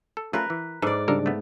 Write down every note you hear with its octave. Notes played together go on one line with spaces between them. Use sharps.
A4
A3 C#4 F4 A#4 B4
E3
G#2 A4 B4 D5
C#3 G3 D4 F4 A4 A#4
A3 B3